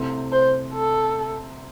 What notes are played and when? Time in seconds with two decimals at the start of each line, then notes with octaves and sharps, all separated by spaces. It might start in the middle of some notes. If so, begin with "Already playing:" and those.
Already playing: C2 C3 A3 C4
0.32 C5
0.74 A4